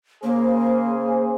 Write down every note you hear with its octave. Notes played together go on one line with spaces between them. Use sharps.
C#3 A#3 G#4 C5